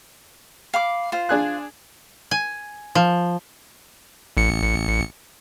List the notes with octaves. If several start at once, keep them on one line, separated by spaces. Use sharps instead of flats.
F5 B5 D6
F4 C5
D4 G#4 F#6
G#5
F3
A1 C#7